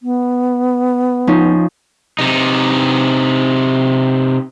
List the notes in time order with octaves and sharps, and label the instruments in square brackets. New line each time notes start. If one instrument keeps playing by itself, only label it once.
[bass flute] B3
[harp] F3 C#4 D#4
[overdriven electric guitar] C3 D#4